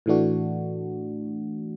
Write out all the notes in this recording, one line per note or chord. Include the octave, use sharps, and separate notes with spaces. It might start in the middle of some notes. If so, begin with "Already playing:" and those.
A2 E3 A3 D4 F#4